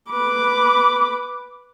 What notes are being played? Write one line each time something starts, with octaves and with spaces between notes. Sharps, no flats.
B4 D6